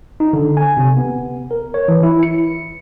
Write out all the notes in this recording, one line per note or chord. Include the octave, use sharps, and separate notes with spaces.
D#4
D3
G#5
C3
B3
A#4
C#5
E3
E4
C#7